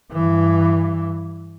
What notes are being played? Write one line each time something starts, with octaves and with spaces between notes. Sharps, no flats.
G2 E3